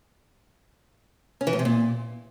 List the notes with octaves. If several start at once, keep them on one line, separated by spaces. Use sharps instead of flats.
C#4
E3
A2
C3
A#2